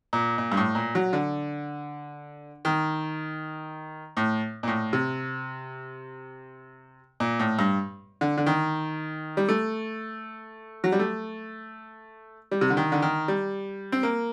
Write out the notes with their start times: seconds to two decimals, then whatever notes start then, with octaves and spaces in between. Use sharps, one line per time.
0.13 A#2
0.38 A#2
0.52 G2
0.57 A2
0.75 A#2
0.95 F#3
1.13 D3
2.65 D#3
4.17 A2
4.63 A#2
4.67 A2
4.93 C3
7.20 A#2
7.39 A2
7.59 G2
8.21 D3
8.37 D3
8.46 D#3
9.37 G3
9.49 A3
10.84 F#3
10.92 G3
10.99 A3
12.51 G3
12.61 C3
12.70 D3
12.77 D#3
12.92 D3
13.02 D#3
13.28 G3
13.92 C4
14.03 A#3